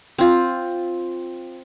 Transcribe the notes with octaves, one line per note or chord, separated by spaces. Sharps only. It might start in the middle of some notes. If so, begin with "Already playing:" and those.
C4 F4